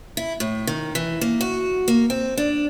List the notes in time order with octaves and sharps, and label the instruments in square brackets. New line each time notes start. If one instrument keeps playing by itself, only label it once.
[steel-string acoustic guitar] E4
A2
D#3
E3
A#3
F#4
A#3
C4
D4